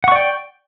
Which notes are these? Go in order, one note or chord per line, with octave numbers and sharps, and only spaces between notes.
D5 F#5 G5 C#6